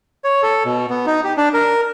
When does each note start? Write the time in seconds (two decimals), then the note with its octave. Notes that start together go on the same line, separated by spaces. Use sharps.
0.24 C#5
0.42 A4
0.65 B2
0.90 B3
1.06 D#4
1.24 G4
1.37 D4
1.54 A#4